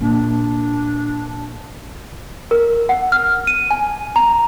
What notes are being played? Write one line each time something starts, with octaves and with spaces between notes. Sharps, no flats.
A#2 D4
A#4
F#5
F6
D#7
G#5
A#5